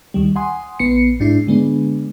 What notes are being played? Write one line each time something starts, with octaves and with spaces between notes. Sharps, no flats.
D2 D#3 G3
F#5 G#5 C6 D#6
A#1 B3 C7 C#7
G#2 D4 E4 C7
D3 G#3 B3 D4